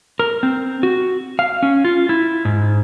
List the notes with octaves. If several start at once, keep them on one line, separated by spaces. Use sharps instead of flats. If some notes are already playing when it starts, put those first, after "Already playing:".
A#4
C4
F#4
F5
C#4
F4
E4
G#2